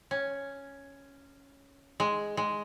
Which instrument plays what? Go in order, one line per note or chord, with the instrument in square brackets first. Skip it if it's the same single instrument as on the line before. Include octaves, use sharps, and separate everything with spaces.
[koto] C#4
G#3
G#3